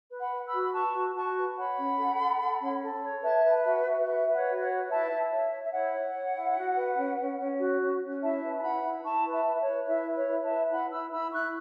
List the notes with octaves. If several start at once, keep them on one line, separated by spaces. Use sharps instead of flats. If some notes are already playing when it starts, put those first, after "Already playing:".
B4
F#5 B5
B4
B5 E6
F#4
B5
B4 A5 C#6
F#4
F#4 A5 C#6
B4
C#5 F#5 B5
C#4
A4
A4
A4
C#4
A4
C#5
B4 E5 A5
B4
F#4 E5
F#4
B4 E5
B4
C#5 F#5
F#4
C#5 F#5
B4
E4 E5 A5
E4
C#5 E5
C#5
E5
E4 C#5 F#5
C#5
C#5
E4
F#4
B4
C#4
C#4
C#4
F#4
C#4
C#4
E4 E5 A5
B4
A5
E4 F#5 B5
E4
E4 A5 C#6
B4
E5 A5
B4
C#5
B4
E4 E5
B4
C#5
B4
E5 A5
B4
E4 F#5 B5
E4 B5 E6
E4 B5 E6
E4 C#6 F#6